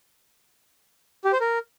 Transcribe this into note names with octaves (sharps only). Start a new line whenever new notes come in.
G4
C5
A#4